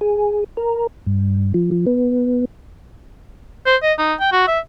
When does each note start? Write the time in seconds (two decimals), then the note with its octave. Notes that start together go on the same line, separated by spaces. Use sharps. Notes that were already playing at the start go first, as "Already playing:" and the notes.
0.01 G#4
0.57 A#4
1.06 G2
1.54 F3
1.71 F3
1.86 B3
3.66 C5
3.83 D#5
3.99 D#4
4.20 G5
4.32 F#4
4.48 E5